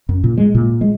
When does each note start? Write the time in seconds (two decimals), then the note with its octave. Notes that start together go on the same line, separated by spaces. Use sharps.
0.09 F#2
0.24 A#2
0.38 G#3
0.55 A#2
0.81 G#3